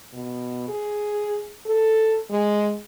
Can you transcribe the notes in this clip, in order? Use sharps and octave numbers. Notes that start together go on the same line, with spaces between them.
B2
G#4
A4
G#3